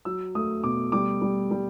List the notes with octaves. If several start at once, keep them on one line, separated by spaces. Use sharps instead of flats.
F#3 E6
A3 D#6
B2 D6
G3 D6
G3
G3